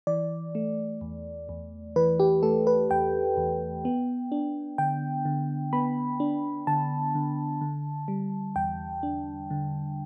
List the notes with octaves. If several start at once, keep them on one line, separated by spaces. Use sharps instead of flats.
E3 D5
A3
E2
E2
E3 B4
G4
A3 A4
B4
E2 G5
E2
B3
D4
D3 G5
D3
B3 B5
D4
D3 A5
D3
D3
G3
E2 G5
D4
D3